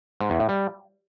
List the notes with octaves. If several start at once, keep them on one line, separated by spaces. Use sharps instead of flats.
G#2
E2
A2
G3